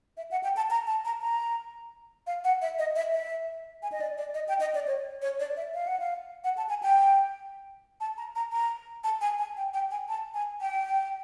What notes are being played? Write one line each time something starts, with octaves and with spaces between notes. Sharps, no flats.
E5
F#5
G5
A5
A#5
A5
A#5
A#5
F5
F#5
E5
D#5
E5
E5
G#5
D#5
D5
D5
D#5
G5
D#5
D5
C#5
C#5
D5
E5
F5
F#5
F5
F#5
A5
G#5
G5
A5
A#5
A#5
A#5
A5
G#5
G#5
G5
G5
G#5
A5
G#5
G5